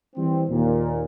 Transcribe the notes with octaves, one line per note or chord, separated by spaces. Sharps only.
E3 G3 C4
D#2 A#2